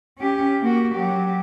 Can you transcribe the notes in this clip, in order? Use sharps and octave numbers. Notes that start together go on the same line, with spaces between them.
C#4 G4
A#3 F#4
F#3 G4